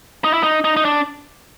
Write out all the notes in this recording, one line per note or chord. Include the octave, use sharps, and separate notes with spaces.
D#4
E4
D#4
D#4
D#4
D4